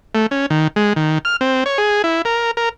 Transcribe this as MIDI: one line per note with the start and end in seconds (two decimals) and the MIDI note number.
0.15 0.27 57
0.31 0.46 61
0.50 0.68 51
0.76 0.93 56
0.96 1.18 51
1.25 1.36 89
1.41 1.64 60
1.66 1.78 73
1.78 2.02 68
2.04 2.22 64
2.25 2.51 70
2.57 2.69 70